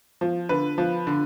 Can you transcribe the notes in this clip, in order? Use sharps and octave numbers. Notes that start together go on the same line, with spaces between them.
F3
D3 B4
F3
D3